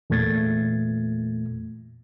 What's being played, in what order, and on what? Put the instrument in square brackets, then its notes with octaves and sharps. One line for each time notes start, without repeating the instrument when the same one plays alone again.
[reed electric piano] E2 A#2 A3 G#6 A6